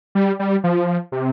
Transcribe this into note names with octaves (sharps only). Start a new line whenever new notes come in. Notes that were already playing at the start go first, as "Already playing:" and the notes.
G3
G3
F3
C3